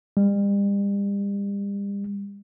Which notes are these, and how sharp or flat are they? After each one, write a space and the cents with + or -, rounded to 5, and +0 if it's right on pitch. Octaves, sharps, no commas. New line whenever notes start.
G3 +40